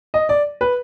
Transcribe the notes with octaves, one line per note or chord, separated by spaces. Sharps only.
D#5
D5
B4